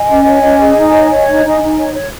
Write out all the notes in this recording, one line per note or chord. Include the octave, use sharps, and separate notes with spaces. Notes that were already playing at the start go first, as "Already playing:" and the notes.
Already playing: D#5 G#5
C#4
C#5
C#4
G#4
D#4
C#5
C#5
D#4
D#4
D#4
C#5
C#5